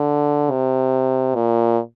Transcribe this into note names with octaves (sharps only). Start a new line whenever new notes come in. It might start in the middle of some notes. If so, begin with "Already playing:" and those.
Already playing: D3
C3
A#2